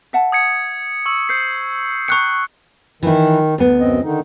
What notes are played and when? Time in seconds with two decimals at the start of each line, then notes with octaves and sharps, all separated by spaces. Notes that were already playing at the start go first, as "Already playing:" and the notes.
0.13 E5 F#5 A5
0.32 D#6 G#6 C#7
1.06 C#6 E6 F#7
1.29 C5 G6 C7
2.08 G5 A#5 C#6 F#6 C#7
3.03 D#3 E3 E4
3.58 D2 B3
3.80 F#2 C4 D#5
4.03 D3 D#3 D#4